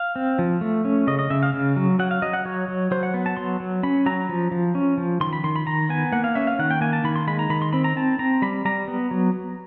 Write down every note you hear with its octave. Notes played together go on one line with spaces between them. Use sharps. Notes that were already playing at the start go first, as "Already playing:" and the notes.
Already playing: F5
C4
F3
A3
C#4
C#3 D#5
D#5
C#3 E5
F5
C#3
F#3
F#3 F#5
F5
F#3 D#5
F#5
F#3 C#5
F#3
F#3 C5
F#5
B3
A5
F#3 C6
F#3
C#4 B5
F#3 A#5
F3
F3
C#4
F3
D#3 C6
B5
D#3 C6
B5
D#3 A#5
B3 G#5
A#3 F#5
F5
C#4 E5
F5
D#3 F#5
G5
A#3 G#5
A5
D#3 B5
C6
G#3 B5
A#5
D#3 B5
C6
C4 B5
A#5
C4 A5
C4 A#5
G3 B5
G3 A#5
B3
F#3